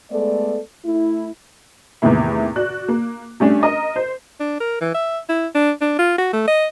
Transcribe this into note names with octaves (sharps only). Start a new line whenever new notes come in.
G#3 A3 B3 A4 D5
A3 E4
E2 A2 C3 D#3 A#3 E4
F#4 D5 F#6
A#3
G3 A3 C#4 D4
A#4 D#5
C5
D4
A#4
E3
E5
E4
D4
D4
F4
F#4
A3
D#5